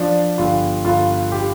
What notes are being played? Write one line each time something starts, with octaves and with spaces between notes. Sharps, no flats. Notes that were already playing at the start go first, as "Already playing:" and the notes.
Already playing: F3 D4
G1 F4
G1 F4
G4